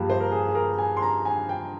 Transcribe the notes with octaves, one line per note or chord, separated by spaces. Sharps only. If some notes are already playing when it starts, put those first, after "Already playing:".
Already playing: G2 F3 A#3 G4 G#4
C5
A#4
G#4
G#4
A#4
G#5
C6
A#5
G#5
G5